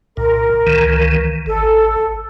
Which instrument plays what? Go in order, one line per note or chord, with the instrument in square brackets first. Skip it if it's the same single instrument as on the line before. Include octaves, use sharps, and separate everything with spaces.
[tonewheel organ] C2 A#2 [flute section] A#4
[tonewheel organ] C#2 D#3 E3
[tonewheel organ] G#1 [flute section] A4